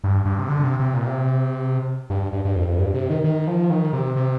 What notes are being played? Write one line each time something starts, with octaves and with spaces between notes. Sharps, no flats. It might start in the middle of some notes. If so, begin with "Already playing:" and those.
G2
G2
C3
D3
C3
C3
A#2
C3
G2
G2
G2
F2
G2
C3
D#3
D#3
F3
D#3
C3
C3